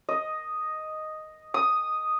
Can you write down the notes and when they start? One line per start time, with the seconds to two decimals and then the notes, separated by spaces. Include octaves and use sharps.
0.09 D#5
1.54 D#6